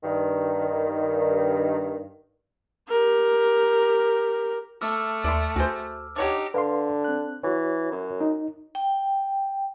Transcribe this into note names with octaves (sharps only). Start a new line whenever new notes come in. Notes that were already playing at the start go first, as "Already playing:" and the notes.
G2 D#3
G4 A#4
A3 D6 E6 F6
D#2 D5 E5 C6
D2 F#4 G#4 C5
D4 D#4 G4 C#5 F#5 D6
D3 B4 F5 C6
C4 F#6
E3 F#4 C#5
F#2
D#4
G5